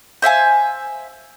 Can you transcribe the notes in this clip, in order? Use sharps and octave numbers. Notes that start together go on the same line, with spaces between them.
C5 E5 F5 G#5